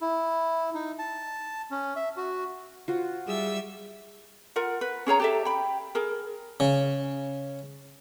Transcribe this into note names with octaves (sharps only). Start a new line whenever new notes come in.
E4
D#4
A5
C#4
E5
F#4
F4 F#4 C5
G3 G#4 E5 E6
F4 A#4 F#5
B4
C#4 G#4 C#5 A#5
G4 A4 E5
G5 B5
G#4 A#4
C#3